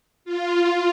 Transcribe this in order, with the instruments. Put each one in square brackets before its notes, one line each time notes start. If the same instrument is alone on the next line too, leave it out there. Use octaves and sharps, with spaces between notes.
[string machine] F4